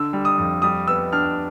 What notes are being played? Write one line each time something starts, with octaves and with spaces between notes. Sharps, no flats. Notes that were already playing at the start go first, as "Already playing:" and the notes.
Already playing: D3 E6
G3
D#6
F2
G3 D#6
B3 E6
D4 F6